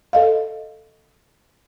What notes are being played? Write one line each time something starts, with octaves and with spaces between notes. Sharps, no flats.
A4 D#5 F5